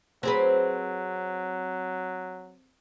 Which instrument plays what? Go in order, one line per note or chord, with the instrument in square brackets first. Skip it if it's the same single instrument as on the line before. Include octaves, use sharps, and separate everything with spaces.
[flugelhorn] F#3 [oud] C4 G#4 B4